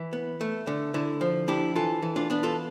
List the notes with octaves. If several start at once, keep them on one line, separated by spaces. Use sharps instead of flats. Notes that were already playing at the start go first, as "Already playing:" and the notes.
Already playing: E3 E4
B3
A3
D3
D3 E4
F3
D4 E4 G4
E3 F4 A4
E3
D4 F4
B3 D4
F4 A4